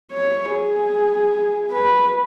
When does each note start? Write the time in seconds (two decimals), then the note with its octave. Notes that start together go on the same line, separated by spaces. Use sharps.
0.12 C#5
0.51 G#4
1.72 B4